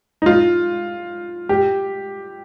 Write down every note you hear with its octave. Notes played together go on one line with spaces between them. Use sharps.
D#4
F4
G4